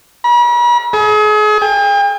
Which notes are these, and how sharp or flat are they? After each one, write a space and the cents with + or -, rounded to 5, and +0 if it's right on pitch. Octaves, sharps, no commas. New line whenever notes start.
B5 -45
G#4 +35
G5 +45